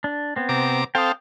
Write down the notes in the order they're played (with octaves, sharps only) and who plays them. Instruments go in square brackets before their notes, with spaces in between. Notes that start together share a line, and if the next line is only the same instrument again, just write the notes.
[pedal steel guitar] D4
B3 C4
[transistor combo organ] C3 A#5 D6
[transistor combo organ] C4 A4 F5 [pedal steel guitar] G5 D#6